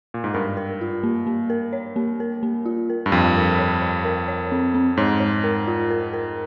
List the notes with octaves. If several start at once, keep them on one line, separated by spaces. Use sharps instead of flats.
A#2
G#2
G2 A#4
A#4
F4
A#3
A#3
A#4
C#5
A#3
A#4
A#3
F4
A#4
G2
F2 A#4
A#4
C#5
C#5
A#4
C#5
C4
C4
G#2 C#5
C#5
A#4
F4
A#4
A#4